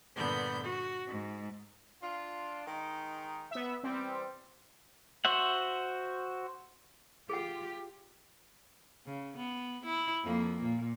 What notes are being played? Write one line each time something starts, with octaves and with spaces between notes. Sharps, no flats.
G2 A#2 D3 B3 B5 G6
F#4
G#2
D4 F4
D#3 G#3 D#4
B3 E5
E3 G3 C4
F#4 C5 E5 F#5
F4 G4 G#4 F#5
C#3
B3
E4
F2 A#3
A#2